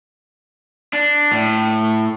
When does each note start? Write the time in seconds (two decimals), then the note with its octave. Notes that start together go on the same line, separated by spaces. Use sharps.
0.93 D4
1.32 A2